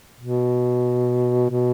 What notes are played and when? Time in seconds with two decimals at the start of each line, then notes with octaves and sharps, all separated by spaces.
0.21 B2
1.50 B2